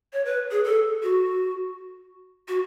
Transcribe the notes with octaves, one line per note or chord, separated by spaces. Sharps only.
C#5
B4
G#4
A4
F#4
F#4